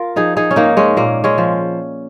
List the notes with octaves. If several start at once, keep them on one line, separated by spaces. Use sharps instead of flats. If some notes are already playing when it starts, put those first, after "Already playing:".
Already playing: F4 A#4
F3 D#4 G#4
D#4 G#4
C#4
G#2 A#3 D#4
G#3 C#4
A#2 A#3
G#3 C#4
F3